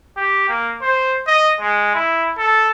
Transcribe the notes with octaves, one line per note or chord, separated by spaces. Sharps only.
G4
A#3
C5
D#5
G#3
E4
A4